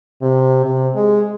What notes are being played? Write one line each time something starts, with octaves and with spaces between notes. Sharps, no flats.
C3
C3
G#3